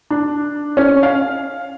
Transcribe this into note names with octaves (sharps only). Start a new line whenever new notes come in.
D4
C#4
F5